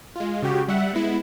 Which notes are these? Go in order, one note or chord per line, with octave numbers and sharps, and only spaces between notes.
G#3 F4
C#3 F#4 G4
G3 E5 F#5
G#3 B3 E4